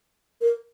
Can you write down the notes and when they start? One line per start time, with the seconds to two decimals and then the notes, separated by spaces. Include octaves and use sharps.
0.41 A#4